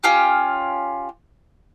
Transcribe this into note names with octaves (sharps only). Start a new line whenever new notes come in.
C#4 F4 G4